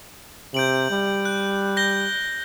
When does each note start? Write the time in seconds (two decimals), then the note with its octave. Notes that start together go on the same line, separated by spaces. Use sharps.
0.54 C3 G6 D7 F#7
0.90 G3
1.25 F#6
1.77 G6 A#6 G7